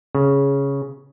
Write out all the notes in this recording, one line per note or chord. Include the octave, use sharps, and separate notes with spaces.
C#3